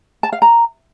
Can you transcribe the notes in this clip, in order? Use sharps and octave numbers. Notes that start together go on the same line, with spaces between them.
A5
F5
A#5